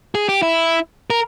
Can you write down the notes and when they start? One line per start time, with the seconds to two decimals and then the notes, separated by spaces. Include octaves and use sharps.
0.15 G#4
0.29 G4
0.43 E4
1.10 A#4